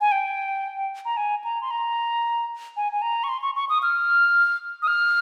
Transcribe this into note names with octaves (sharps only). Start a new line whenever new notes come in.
G#5
G5
A#5
G#5
A#5
C6
A#5
G#5
G#5
A#5
C#6
C6
C#6
C#6
D#6
F6
D#6
F6